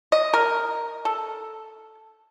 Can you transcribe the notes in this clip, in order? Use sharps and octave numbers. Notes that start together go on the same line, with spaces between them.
D#5
A#4
A4